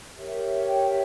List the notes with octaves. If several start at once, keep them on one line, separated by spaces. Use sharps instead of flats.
G4 A#4 C#5 E5
G5
E5